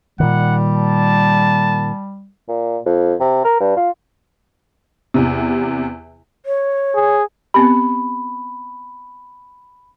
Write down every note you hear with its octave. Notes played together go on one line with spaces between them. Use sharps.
A#2 D#3 G3 F#5
A5
A#2
F2
C3
A#4
G2
F4
E2 C3
C#5
G#4
B3 C4 G4 B5